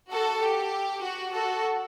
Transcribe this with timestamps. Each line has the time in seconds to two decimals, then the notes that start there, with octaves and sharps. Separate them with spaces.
0.10 F#4 A4
0.41 G4
1.02 F#4
1.33 F#4 A4